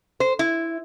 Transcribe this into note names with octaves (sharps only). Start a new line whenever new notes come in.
C5
E4